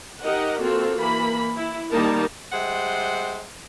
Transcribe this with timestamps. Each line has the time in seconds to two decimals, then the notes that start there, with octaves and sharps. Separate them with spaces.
0.22 D#4 G4 A#4 D#5 F#5
0.61 A#3 C4 F4 F#4 A4
0.99 E3 A#3 B5
1.56 E4
1.91 D#3 G3 A#3 D#4 A#4 A5
2.52 G3 G#3 C5 E5 F#5